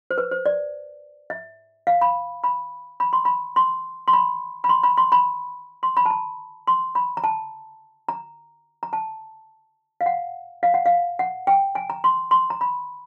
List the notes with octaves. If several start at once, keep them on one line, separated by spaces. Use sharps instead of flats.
C5
B4
C5
D5
E5
F5
B5
B5
B5
C6
B5
C6
C6
B5
B5
C6
B5
C6
B5
C6
B5
A5
A#5
C6
B5
A#5
A5
A#5
A#5
A5
F5
F#5
F5
F#5
F5
F#5
G5
G#5
A#5
C6
C6
A#5
B5